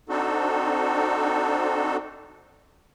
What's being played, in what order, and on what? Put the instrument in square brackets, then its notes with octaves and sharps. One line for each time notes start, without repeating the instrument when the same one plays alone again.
[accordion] C4 D4 D#4 F#4 A4